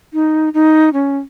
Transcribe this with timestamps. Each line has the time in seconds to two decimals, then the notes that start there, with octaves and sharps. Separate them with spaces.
0.13 D#4
0.54 D#4
0.93 C#4